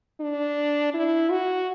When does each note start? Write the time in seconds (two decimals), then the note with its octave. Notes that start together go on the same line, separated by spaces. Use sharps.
0.21 D4
0.94 E4
1.31 F#4